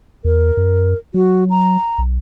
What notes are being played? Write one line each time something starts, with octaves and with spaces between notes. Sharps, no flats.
E2 A#4
F#2
F#3 F#4
A#5
B1